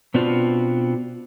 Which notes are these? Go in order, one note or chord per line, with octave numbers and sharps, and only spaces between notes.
B2 B3 C4 D4 F4 F#4